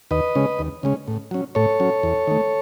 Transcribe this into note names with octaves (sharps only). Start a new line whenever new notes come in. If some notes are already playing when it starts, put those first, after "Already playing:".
D#2 B4 D#5
C#3 G#3 C#4
D#2
C#3 G#3 C#4
A2
F#3 C#4
A2 A4 C#5
F#3 C#4
E2
D#3 A3